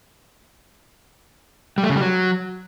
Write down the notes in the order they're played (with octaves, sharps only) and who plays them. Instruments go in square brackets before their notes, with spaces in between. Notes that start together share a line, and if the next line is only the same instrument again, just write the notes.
[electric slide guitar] G3
A3
C#3
G3
F#3